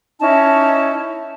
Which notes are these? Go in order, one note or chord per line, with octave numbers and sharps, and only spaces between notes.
C#4 D#4 E4 A5